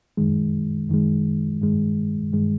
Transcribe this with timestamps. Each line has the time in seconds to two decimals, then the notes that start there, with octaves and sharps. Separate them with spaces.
0.17 F#2 D#3 G#3
0.89 F#2 D#3 G#3
1.62 G2 D#3 G#3
2.33 G2 D#3 G#3